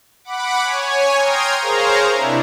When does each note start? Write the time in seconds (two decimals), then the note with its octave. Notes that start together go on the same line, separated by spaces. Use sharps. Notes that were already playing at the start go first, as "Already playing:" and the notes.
0.24 F#5 B5 D6
0.62 C#5 G#5
1.16 G5 A#5 C6 D#6 F6 G#6
1.60 G#4 A#4 C5 C#5 F5 A#5
2.12 C3 D4 E4